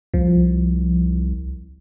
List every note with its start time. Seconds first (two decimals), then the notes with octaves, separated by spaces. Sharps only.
0.14 C2 F3